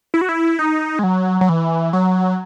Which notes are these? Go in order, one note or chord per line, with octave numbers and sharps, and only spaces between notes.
E4
F#4
E4
D#4
G#3
F#3
F#3
E3
F#3